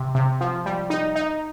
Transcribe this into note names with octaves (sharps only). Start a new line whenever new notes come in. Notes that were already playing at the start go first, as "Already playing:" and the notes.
Already playing: C3
C3
F3
G3
D#4
D#4